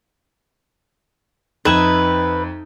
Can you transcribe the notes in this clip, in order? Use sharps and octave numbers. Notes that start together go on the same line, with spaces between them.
F2 D#4 B4 E5 G#5